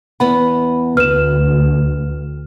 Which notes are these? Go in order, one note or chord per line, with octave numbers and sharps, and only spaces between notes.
E2 B3 F#5 B5
D2 B4 F6 E7